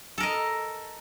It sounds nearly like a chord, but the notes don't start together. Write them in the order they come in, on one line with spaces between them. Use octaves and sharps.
A4 A#4 D#5